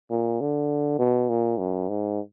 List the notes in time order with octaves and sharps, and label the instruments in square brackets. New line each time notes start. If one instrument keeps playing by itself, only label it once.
[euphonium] A#2
D3
B2
A#2
F#2
G#2